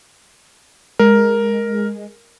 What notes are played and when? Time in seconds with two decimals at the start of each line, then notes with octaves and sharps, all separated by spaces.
0.99 G#3 A#4